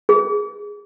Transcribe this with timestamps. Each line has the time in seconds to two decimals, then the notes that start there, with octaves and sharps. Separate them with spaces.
0.09 G#4